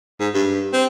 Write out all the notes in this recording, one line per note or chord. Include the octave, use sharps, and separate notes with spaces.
G#2
G2
C4